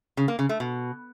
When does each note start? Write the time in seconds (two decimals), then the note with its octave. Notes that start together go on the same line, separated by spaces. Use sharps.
0.17 C#3
0.28 A#3
0.39 C#3
0.49 A3
0.60 B2